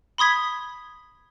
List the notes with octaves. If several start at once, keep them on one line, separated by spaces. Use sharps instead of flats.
B5 C6 D#6 G#6 B6